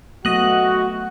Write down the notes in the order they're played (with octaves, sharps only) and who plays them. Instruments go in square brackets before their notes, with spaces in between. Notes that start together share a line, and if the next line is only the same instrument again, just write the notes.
[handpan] F#3 A3 B3 [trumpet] F#4 [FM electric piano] D#5 F#6